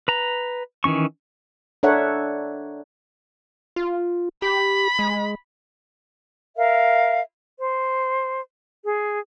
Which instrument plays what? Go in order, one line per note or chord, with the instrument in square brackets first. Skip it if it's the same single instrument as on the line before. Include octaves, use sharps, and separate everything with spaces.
[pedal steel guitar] B4 A#5
D#3 E3 C#4 C#6
[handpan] D4 A4 A#4 C#5 E5 F#5
[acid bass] F4
[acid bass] G4 [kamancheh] B5
[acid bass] G#3
[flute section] A#4 E5 F5
C5
G#4